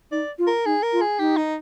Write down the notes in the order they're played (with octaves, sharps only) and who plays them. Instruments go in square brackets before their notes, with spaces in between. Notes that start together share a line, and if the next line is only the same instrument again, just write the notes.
[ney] D#4 [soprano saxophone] D5
[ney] F4
[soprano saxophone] A#4
[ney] D#4 [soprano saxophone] G#4
[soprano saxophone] A#4
[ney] F4
[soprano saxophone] G#4
[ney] D#4 [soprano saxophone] G4
[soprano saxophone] D#4